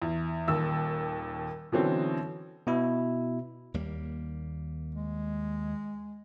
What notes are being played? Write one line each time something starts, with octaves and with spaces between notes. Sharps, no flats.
E2
D#1 D#2 E6
B2 D3 E3 F#3 C4 C#4
B2 E4
D#2 G3 A#3
G#3